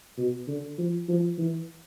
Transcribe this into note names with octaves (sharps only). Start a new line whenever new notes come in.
B2
D3
F3
F3
E3